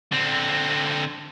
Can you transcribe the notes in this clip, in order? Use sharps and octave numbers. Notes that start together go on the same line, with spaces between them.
D3 C4